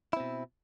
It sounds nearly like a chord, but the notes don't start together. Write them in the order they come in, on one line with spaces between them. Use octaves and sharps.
E4 C4 B2